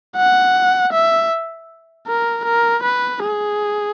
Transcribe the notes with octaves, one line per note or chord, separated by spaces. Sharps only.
F#5
E5
A#4
A#4
B4
G#4